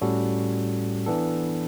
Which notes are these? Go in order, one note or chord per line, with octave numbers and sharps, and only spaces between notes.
A2 G3 C#4 F#4 A4
E3 B3 D4 A4